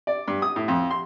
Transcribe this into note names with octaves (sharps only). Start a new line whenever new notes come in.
D5
G2
D#6
A2
F2
C6